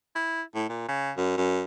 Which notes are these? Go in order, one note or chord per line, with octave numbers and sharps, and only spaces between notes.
E4
A2
A#2
C#3
F#2
F#2